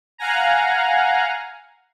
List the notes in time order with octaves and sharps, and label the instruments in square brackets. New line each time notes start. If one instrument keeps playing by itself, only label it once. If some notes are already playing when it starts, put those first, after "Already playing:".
[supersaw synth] F5 F#5 G#5 A#5